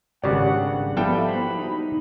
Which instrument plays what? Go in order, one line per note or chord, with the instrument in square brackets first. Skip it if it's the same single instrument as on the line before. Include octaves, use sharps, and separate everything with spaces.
[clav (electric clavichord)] G#1 C#3 [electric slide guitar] G2 D4 [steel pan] G4 D5 [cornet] F#5
[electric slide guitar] F3 [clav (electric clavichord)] G3 A4 G5 [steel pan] B3 E4 [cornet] B5
[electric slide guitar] A#3 F#4 C5
D#4